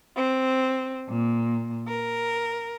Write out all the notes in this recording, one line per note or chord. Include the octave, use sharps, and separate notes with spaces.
C4
A#2
A#4